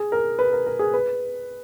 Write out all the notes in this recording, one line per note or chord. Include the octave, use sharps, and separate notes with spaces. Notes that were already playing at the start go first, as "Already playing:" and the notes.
Already playing: G#4
A#4
B4
A#4
A#4
G#4
B4